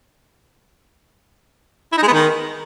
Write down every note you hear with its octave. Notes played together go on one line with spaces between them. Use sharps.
E4
D#4
G#3
B3
D#3